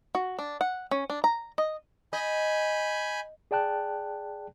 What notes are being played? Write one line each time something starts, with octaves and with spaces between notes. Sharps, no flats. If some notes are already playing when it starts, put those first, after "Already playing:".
F#4
D4
F#5
C#4
D4
A#5
D#5
D#5 G#5 B5 G6
G#4 D5 G5 A5 F#6